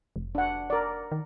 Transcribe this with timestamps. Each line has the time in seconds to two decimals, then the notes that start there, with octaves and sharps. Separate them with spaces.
0.16 F1
0.35 D4 F#5
0.70 A#4 D5
1.12 D#3